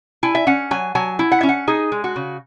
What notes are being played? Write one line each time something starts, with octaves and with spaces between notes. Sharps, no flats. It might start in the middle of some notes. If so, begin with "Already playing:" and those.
E4 G#5
E5
C#4 F#5
F#3 G#5
F#3 G#5
E4
F#5
C#4 E5
F#5
D#4 G#4
G#3
F#4
C#3